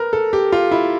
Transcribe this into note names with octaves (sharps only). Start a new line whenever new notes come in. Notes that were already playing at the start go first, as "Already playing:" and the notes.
Already playing: A#4 B4
A4
G4
F4
E4